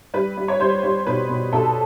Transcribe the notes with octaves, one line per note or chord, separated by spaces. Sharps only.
G3 B4
G3
C#5
G3 C5
G3
B2 B4
B2
B2 A4